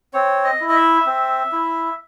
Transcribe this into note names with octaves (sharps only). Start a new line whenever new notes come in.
C4 C#5
D#5
E4
D#5
E5
C4
E4